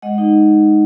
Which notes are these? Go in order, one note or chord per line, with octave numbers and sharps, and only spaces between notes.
G#3 D#5 F#5
D#4